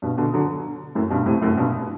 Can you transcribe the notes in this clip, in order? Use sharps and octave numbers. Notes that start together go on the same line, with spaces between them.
G2 B2
B2 D3
D3 F#3
F#2 A2
G2 B2
A2 C3
F#2 A2
G2 B2